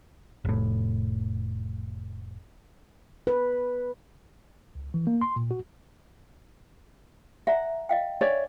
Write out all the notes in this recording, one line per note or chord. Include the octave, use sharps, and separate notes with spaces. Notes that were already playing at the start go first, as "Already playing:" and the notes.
F1 A2
B4
C#2
E3
A#3
C6
A#2
F#4
E5 F#5 A#5
D#5 F5 G5
D4 C#5 D5 E5